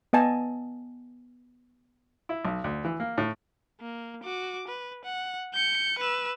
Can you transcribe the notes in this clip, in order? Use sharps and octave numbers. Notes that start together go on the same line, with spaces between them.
B3 D#5 G#5 A5
E4
B1
D2
E3
A#3
A2
A#3
F#4 D6
B4
F#5
G6 C#7
B4 E6